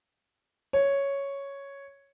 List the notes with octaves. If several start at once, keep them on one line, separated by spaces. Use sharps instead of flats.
C#5